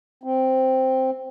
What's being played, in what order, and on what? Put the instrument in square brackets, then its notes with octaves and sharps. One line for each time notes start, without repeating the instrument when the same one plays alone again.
[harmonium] C4